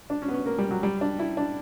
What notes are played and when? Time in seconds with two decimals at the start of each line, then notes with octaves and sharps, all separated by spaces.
0.10 D4
0.22 C#4
0.28 B3
0.34 C#4
0.46 A#3
0.58 G3
0.71 F#3
0.83 G3
1.01 D4
1.19 E4
1.37 D4